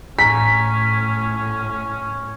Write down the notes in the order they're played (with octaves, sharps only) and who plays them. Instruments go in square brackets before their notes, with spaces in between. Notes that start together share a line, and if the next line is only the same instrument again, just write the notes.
[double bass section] A2 [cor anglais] C#4 [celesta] G#5 A#5 [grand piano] B6